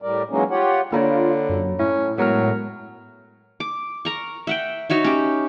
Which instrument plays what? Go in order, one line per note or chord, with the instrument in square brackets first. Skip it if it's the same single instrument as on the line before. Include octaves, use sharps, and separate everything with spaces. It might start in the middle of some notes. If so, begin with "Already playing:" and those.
[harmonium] A2 G3 A#4 D5
E3 F#3 G#3 A#3 C#4 D#4
F4 G4 C#5 F#5
[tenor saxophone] D3 [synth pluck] A#3 D4 [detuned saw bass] F4 [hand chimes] C#5 A#5 B5
[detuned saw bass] F#2
[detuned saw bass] A2 [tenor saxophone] C#4 [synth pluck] E4
[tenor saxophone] F#3 [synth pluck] G#3 B3 [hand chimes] A#4 A#5 F6
[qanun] D6
A#4 A#5 C#6
E5 F#5 G5
D#4 F#4 C#5 E5
C#4 G4